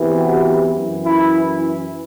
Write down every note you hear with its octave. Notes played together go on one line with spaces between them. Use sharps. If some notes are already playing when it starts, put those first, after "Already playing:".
Already playing: E2 C3 E3
F#4
F#2 E3
E4